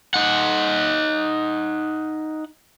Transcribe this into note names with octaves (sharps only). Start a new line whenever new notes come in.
D#4 F#5